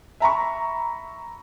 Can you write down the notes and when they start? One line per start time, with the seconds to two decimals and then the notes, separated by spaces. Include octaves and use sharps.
0.20 E5 A#5 B5 C#6